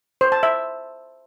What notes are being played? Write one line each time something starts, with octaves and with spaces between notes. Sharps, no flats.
C5
A5
E5